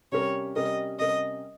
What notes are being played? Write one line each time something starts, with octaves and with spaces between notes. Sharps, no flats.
C3 G3 C#4 G4 A#4 C#5
C3 G3 C#4 G4 A#4 D#5
C3 G3 C#4 G4 A#4 D#5